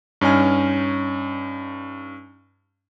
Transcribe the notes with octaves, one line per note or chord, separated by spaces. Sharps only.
G2 C#4 D#4 G#5 F6